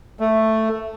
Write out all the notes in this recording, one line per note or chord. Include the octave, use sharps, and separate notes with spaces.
A3